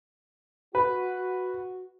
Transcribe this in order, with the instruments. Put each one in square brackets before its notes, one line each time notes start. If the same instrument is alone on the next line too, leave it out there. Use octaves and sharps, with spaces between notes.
[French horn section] F#4 [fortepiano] B4